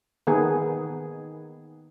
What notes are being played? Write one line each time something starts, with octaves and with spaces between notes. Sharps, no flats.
D#3 B3 G#4